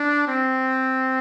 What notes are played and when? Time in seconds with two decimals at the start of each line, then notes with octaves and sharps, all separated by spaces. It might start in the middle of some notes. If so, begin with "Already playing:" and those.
Already playing: D4
0.28 C4